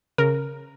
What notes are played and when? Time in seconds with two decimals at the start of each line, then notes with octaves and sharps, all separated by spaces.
0.18 C#3 A#4